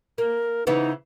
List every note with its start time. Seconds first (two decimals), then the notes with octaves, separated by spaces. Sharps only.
0.18 A#3 A#4
0.67 C#3 E3 B3 D#4